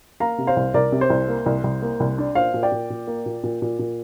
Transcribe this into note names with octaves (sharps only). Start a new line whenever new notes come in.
A#3 F5 A#5
C3
C5 F5
C2
C2 A#4 D5
C3
C5
C2
A#3
C2
C2
A#3
C2
D4
A#2 C5 F5
A#2
D5 G5
A#2
A#2
A#3
A#2
A#2
A#2
A#2